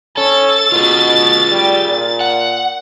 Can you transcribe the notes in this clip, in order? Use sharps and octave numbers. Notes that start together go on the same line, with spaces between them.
C#4 A4 A6
B2 F4 G#4
G3
A#2
F#5